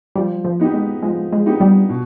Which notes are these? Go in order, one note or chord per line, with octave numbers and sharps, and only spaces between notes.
F3 G3
F3
B3 D#4 G4
G#3
F3 G#3
G#3
B3 D#4 G4
G3
B2